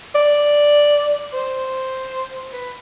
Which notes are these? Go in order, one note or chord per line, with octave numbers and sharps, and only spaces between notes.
D5
C5
B4